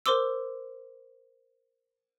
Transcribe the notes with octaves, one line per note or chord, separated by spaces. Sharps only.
A#4 C5 C6 D6 E6